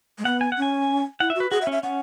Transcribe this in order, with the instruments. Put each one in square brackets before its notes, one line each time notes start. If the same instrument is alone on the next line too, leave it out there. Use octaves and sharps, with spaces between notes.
[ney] G#3
[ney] B3 [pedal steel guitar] F#5
[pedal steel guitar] G#5
F#5
[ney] C#4 [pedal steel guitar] G#5
[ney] E4 [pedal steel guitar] F#5
[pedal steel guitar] E5
[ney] F#4 [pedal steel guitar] B4
[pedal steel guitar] F#4 [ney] G#4
[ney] E5
[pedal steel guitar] C#4
[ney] E5
[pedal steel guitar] C#4 [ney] F#5